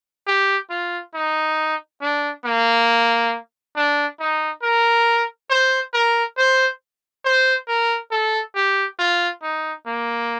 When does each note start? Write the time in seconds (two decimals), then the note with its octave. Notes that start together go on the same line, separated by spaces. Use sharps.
0.27 G4
0.70 F4
1.15 D#4
2.01 D4
2.45 A#3
3.76 D4
4.20 D#4
4.63 A#4
5.50 C5
5.94 A#4
6.38 C5
7.25 C5
7.68 A#4
8.12 A4
8.56 G4
8.99 F4
9.43 D#4
9.87 A#3